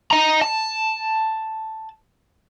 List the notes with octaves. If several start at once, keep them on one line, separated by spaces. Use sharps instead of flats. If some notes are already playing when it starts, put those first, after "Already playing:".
D#5 A#5
A5